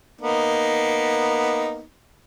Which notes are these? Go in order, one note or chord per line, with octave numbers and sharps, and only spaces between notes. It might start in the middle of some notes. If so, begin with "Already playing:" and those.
A#3 B3 D#4